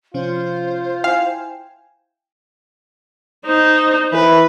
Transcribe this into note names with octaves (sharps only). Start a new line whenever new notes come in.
C3 F3 C#4 F4 C5
E4 F5 G5 G#5
D#4 C5
E3 B4